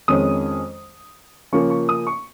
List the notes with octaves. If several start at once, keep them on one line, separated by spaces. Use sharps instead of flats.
F2 D#3 G#3 C#4 D#6
C#3 F3 A#3 C#4 C#6
C#6
D#6
C#6